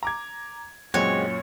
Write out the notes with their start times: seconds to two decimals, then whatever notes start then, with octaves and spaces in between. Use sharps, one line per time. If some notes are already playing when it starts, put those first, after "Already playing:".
0.03 A#5 D6 G#6
0.94 F#2 A#2 G#3 C4 F#4 C#5